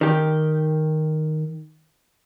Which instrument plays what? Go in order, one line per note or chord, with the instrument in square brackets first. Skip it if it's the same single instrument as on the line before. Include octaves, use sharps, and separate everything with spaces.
[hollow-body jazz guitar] D#3 G4